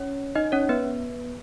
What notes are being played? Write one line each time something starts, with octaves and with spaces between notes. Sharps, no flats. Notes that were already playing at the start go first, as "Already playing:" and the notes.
Already playing: C#4 C#5
D#4 D#5
C#4 C#5
B3 B4